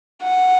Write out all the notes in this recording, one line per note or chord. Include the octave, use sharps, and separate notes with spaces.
F#5